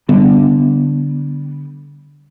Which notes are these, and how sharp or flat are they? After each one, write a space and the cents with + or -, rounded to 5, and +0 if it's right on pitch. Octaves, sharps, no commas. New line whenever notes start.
D3 -10 G3 +0 B3 +0